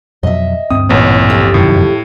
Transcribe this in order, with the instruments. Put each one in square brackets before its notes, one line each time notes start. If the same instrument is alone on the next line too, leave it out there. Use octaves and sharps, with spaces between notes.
[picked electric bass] F2 B2 F#3 [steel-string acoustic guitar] D#5 E5
[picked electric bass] D2 G2 C4 [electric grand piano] D#6
[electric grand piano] A1 B3 [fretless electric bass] A#2 [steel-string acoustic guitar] C#5
[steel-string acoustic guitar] F3 G4 A4
[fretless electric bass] F1 F#2 D#3 [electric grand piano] A2